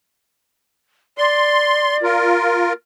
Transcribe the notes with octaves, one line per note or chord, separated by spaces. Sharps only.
D5 C6
F4 A#4